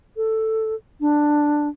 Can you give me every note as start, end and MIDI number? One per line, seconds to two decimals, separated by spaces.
0.17 0.75 69
1.01 1.68 62